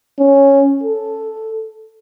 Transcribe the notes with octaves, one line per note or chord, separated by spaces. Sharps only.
C#4
A4